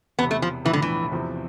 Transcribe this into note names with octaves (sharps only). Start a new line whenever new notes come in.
E1 E2 C3 B3
A3
F3
B1 A2 E3 F3
D3
E3
E2 C3 F3 C4 E4